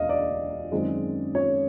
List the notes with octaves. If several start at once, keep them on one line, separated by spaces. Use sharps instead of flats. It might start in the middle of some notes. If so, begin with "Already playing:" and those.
Already playing: E1 D2 C#3 D#5 F5
D5
F#2 D#3 G#3 C4
C#5